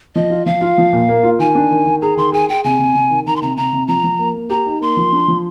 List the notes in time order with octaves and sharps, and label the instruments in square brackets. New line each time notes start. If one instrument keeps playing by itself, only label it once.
[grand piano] F3 [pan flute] D#5
[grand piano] F4
[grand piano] F3 [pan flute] F5
[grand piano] F4
F3
A#2
A#3
F4
[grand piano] D#3 [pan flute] G#5
[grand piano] D4
D#3
D#3
[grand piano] G#4 [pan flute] A#5
[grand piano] D#3 [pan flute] C6
[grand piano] G#4 [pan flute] G#5
[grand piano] G#4 [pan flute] G5
[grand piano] C3 [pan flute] G#5
[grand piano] C3
C3
D#3
[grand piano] D#3 [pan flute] A#5
[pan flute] C6
[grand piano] C3 [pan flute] A#5
[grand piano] C3 [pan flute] A#5
[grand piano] C3
[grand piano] F3 [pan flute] A#5
[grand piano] F3
A#3
A#3
[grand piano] G4 [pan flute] A#5
[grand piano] D#4
[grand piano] A#3 [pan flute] C6
[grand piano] F3
D4
F3